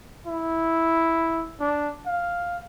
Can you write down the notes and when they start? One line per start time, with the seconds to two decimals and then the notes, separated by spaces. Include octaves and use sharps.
0.27 E4
1.60 D4
2.06 F5